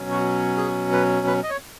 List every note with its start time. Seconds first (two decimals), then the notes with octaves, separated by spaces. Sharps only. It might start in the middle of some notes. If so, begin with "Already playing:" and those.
Already playing: B2 F#3 C#4
0.11 F#4
0.57 G#4
0.93 B4
1.27 B4
1.43 D#5
1.50 C#5